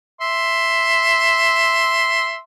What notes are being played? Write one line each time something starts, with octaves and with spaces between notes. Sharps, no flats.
E5 C6